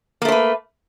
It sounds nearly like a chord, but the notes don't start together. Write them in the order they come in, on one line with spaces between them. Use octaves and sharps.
A#3 A3 C5 B4